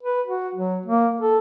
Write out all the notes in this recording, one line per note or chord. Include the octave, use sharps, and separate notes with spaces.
B4
F#4
F#3
A#3
A4